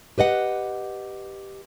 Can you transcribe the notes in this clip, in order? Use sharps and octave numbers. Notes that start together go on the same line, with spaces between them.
G4 B4 D#5 F#5